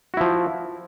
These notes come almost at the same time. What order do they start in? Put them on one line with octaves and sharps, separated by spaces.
F#4 E4 F3